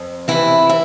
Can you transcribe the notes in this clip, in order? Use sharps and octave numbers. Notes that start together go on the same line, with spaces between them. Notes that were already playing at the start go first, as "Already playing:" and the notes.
Already playing: F2
C3 E3 E4
E4